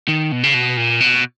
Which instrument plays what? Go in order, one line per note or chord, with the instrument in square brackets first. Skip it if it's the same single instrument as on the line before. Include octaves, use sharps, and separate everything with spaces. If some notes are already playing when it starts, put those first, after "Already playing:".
[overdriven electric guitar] D#3
B2
C#3
B2
A#2
B2